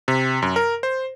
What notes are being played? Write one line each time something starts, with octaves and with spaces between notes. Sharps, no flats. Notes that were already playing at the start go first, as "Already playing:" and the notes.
C3
F#2
A#4
C5